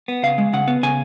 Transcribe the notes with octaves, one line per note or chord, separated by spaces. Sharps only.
B3
C#3 F5
G#3
C#3 F#5
B3
C#3 G#5